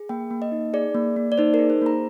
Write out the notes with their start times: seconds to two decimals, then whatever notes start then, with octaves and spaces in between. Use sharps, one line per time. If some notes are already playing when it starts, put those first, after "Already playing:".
Already playing: G#4
0.09 A#3 G5
0.31 A#3
0.42 D#5
0.52 D#4
0.74 G#4 D5
0.95 A#3
1.16 A#3
1.32 D5
1.38 D#4 C5
1.54 A#4
1.59 G#4
1.70 C5
1.82 A#3 A#5